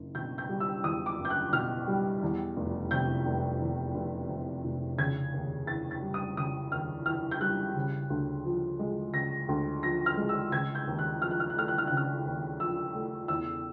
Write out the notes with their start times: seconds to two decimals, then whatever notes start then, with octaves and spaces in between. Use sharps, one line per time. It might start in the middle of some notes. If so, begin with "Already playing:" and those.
Already playing: F#1
0.15 B2 G6
0.38 G6
0.49 G3
0.60 E6
0.83 E2 D#6
1.06 D6
1.18 F#1
1.25 G6
1.30 F#6
1.53 B2 F6
1.87 G3
2.22 E2
2.57 F1
2.91 C3 G6
3.26 F1
3.61 E2
3.95 F1
4.29 C3
4.64 F1
4.98 C#3 G#6
5.34 D#2
5.67 E3 A6
5.91 A6
6.02 G3
6.14 D#6
6.37 C#3 D#6
6.71 D#2 F6
7.06 E3 F6
7.31 G6
7.41 G3 F#6
7.76 C#3
8.10 D2
8.45 F3
8.79 G#3
9.13 C#3 A#6
9.49 D2
9.83 F3 A#6
10.06 F6
10.17 G#3
10.29 E6
10.52 C#3 G#6
10.75 G6
10.87 D#2
10.99 F#6
11.21 F3 F6
11.31 F#6
11.40 F6
11.50 F#6
11.57 A3 F6
11.68 F#6
11.78 F6
11.87 C#3 F#6
11.97 F6
12.25 D#2
12.60 F3 E6
12.95 A3
13.28 E2 E6